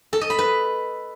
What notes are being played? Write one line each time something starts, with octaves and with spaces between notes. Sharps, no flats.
A4
D#5
B5
B4